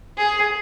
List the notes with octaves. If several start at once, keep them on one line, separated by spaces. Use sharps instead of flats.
G#4